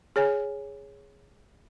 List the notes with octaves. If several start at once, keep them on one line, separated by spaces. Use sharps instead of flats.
G#4 C#5 G#5